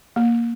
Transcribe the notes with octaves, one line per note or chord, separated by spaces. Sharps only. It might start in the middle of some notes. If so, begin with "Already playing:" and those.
A#3